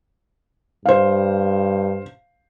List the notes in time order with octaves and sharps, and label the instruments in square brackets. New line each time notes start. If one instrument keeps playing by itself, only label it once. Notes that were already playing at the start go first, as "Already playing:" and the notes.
[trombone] G2 [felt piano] C5 F5